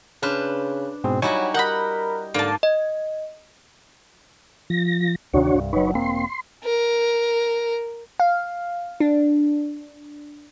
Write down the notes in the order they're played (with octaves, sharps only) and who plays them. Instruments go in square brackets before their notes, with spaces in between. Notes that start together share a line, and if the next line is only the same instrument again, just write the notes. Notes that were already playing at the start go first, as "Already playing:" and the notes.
[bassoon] C#3 [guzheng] D4 B4 C5 [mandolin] F6
[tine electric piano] G#2 B2 G#4 [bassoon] C4
[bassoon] F#3 [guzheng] G3 E4 F#4 [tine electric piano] D#4 G#5 C#6
[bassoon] A#4 [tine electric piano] D#5 G6 [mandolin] F#5 B5
[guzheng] G#2 [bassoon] D3 [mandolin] A#3 A5
[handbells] D#5
[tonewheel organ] F3 A#6
[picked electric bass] D2 C3 D#3 [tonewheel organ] D4 F#4 C#5
[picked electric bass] C2 G2
[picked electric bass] F#1 F#3 [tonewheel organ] D#4 B4 C#5
[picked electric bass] E1 A#3 C4 [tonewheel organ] C6
[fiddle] A#4
[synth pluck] F5
D4